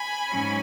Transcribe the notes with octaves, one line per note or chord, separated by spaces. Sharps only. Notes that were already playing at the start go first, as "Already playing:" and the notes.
Already playing: G#5 B5
G#2 F#3 C#4